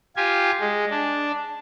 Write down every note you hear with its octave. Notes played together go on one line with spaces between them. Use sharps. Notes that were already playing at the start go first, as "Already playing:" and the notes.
F4 G4 G#5
G#3
D4